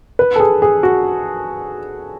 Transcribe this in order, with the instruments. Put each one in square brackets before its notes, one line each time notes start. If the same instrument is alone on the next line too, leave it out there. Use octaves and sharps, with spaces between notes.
[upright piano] B4
A4
G#4
G#4
F#4